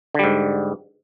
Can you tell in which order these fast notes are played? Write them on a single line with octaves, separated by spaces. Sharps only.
D3 G3 G#2